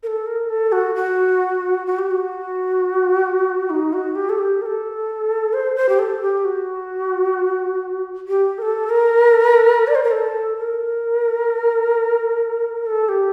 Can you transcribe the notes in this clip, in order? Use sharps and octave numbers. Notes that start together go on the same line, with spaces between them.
A#4
A4
A#4
A4
F#4
F#4
F#4
G4
F#4
D#4
F#4
G4
A4
G4
A#4
A4
C5
C5
G4
A4
G4
F#4
G4
A#4
A4
A#4
D5
C5
A#4
A4
A#4
A4
G4